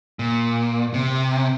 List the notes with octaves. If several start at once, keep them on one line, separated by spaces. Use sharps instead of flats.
A#2
C3